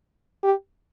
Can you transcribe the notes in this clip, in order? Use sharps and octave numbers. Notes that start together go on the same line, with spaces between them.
G4